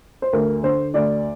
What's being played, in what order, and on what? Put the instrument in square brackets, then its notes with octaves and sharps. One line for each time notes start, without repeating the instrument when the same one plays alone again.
[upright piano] C5
D2 A#4
D3 C5
D2 D5